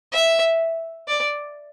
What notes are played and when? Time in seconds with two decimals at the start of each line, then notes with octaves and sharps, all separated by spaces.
0.13 E5
1.08 D5